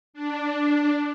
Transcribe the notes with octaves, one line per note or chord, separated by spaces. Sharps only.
D4